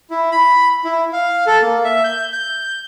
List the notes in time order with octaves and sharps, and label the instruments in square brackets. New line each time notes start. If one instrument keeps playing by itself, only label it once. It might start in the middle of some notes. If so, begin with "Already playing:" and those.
[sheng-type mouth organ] E4
B5
E4
F5
A4
A#3
E5
G6
G6